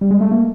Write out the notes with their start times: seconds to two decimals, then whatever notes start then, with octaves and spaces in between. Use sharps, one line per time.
0.01 G3
0.11 G#3
0.21 A3
0.31 A#3